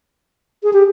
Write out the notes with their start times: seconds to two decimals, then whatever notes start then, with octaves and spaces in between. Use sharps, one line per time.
0.63 G#4
0.73 G4